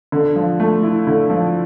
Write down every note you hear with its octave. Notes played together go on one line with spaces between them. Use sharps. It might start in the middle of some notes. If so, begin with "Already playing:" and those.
D3
F3
A3
E4
D3
F3